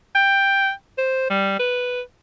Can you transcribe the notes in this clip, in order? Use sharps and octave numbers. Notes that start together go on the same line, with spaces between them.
G5
C5
G3
B4